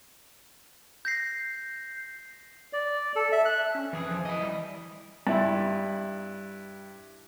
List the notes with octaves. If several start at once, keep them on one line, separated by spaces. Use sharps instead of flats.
G6 A#6 C7
D5
A4
E5
F#6
C#4
F2 E3 G#4
F3
E3 E4 D#5
G3
G2 E4 C6